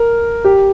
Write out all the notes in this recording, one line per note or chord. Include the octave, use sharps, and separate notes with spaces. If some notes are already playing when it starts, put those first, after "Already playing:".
Already playing: A#4
G4